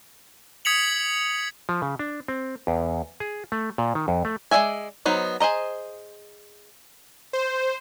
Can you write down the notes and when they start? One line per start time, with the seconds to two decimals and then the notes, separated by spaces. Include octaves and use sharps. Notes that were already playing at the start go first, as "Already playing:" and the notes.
0.65 D#6 G#6 B6 C#7 F7 F#7
1.69 F3
1.82 C#3
1.99 D4
2.28 C4
2.67 E2
3.20 G#4
3.52 A3
3.78 A#2
3.95 D#3
4.08 F2
4.25 A3
4.51 G#3 F4 D5 E5 G#5
5.06 F#3 B3 D#4 C5
5.40 G#4 C5 D#5 A#5
7.33 C5